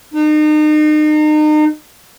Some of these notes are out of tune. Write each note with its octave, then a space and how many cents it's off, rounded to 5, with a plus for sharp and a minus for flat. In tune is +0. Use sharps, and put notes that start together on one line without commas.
D#4 -35